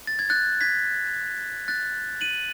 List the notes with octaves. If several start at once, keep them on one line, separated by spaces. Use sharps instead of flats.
A6
G#6
F#6 A6
G#6 B6
F#6 A6
D#7 F#7